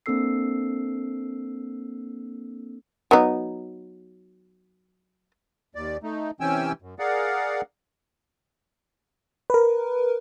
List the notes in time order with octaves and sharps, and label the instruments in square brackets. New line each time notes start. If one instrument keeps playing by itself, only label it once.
[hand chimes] A#3 C4 D4 A4 E6 C7
[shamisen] F#3 B3 D#4
[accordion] D#2 D5
A3 D#4
C3 E3 C#4 G5 G#5 E6
F#2
G#4 A#4 D5 F5 F#5
[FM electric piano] A#4 B4